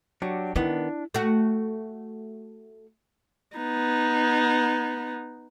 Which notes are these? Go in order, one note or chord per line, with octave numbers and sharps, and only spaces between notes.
F#3 D4 F#4 G4
D#3 B3 D4 E4
A3 F#4
B3 D#4